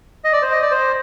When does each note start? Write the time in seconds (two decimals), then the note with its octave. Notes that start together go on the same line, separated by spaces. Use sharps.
0.24 D#5
0.33 D5
0.42 C5
0.52 D#5
0.62 D5
0.71 C5